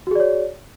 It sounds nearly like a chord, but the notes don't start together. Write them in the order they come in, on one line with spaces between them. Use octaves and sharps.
F#4 G#4 D5 C#5